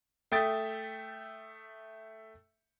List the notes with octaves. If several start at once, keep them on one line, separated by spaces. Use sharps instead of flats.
A3 E5 G5 D#6 A6